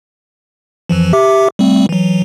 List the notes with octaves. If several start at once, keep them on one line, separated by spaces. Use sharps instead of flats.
F2 E3 F3
G4 E5 D6
G3 A3 C4
E3 F#3